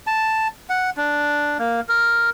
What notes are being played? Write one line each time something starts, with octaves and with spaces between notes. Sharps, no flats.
A5
F#5
D4
A#3
A#4